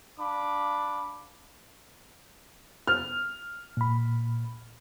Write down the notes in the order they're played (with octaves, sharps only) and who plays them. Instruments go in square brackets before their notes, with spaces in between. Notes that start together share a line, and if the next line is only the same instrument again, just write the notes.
[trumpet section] D4 F5 B5 D6
[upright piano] F6
[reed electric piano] A#2 B5